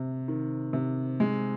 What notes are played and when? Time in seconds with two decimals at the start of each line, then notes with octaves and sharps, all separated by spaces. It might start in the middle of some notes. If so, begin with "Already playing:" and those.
Already playing: C3
0.28 D#3
0.73 C3
1.20 G#3